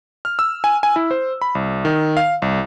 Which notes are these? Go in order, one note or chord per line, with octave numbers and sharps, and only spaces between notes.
F6
E6
G#5
G#5
E4
C5
B5
C2
D#3
F5
C2